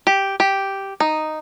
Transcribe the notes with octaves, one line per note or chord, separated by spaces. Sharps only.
G4
G4
D#4